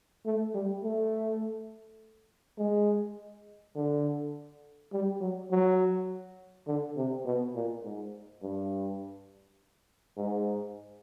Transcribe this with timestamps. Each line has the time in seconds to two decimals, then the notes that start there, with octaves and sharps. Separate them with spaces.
0.25 A3
0.55 G3
0.84 A3
2.58 G#3
3.76 D3
4.92 G3
5.21 F#3
5.51 F#3
6.67 D3
6.97 C3
7.25 B2
7.55 A#2
7.84 G#2
8.42 G2
10.17 G#2